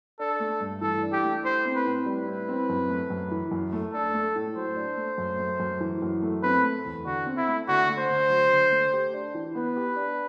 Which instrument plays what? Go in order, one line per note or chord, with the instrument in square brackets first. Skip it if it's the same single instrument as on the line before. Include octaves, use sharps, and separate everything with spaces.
[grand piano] D4 [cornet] A4
[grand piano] A3
G2
[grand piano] E3 [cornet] A4
[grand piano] D4
[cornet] G4
[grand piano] A3
[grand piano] E4 [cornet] C5
[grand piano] C4
[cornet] B4
[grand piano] A2
[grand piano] G3 [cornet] B4
[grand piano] E4
C4
F#2
A3
F#2
E3
F#2
A3
[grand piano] D4 [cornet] A4
[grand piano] A3
A2
[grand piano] F#3 [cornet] C5
[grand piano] D4
A3
F#2
A3
F#2
E3
F#2
A3
[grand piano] C4 [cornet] B4
[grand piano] A3
E2
[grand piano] D3 [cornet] F#4
[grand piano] C4
[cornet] E4
[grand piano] A3
[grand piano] D3 [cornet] F#4
[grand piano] A3
[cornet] C5
[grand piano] D3
F#3
D3
A3
G4
D4
E3
[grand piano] B3 [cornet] B4
[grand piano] G4
D4